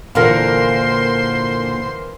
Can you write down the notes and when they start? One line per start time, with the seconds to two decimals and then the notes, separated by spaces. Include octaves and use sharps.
0.15 A#2 D3 E3 A#4 C5 F5 F#5 C6